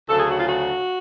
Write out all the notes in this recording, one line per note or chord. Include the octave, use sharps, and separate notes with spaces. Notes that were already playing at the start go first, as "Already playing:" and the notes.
D2 C#3 F#3 A4
G#4
F#4
F4
F#4